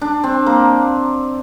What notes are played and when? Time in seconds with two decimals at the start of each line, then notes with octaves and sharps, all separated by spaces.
0.01 D4
0.24 C4
0.46 A#3